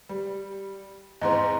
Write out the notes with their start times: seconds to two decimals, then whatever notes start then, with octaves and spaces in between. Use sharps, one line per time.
0.09 G3
1.21 E2 G#2 C4 D#5 A#5 C6